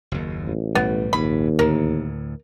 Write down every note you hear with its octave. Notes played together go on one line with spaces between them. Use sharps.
F#1 D#2
A1
B1 A2 G3 B3
A#1 D#2 G#2 B5
D2 A2 A#4